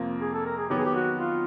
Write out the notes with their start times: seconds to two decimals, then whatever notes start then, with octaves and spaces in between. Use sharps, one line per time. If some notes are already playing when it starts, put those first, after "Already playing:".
Already playing: F2 C3 F3 A#3
0.21 G#4
0.33 A4
0.46 A#4
0.58 G#4
0.70 D#3 F#3 B3 G4
0.78 G#4
0.86 G4
0.95 F#4
1.19 F4